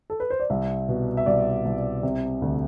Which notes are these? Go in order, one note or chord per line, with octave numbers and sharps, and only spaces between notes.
A4
B4
C5
D5
C2 E5
B2
E5
C2 D5
C2
C3
D2